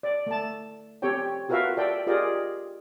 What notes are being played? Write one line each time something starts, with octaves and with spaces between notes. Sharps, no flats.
D5
A3 A5
C4 G4 A4 C#5 G5
F4 F#4 A#4 B4 E5 F5
A4 D5 E5 G5
F4 G4 G#4 A#4 D5 D#5